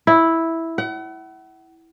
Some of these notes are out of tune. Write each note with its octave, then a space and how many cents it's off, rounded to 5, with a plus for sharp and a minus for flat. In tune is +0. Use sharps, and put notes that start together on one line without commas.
E4 -5
F#5 +35